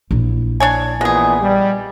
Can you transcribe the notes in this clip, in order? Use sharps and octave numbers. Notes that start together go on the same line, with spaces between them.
A#1 E4
D4 C#5 G#5
A#2 E3 G#3 B3 G#4
G3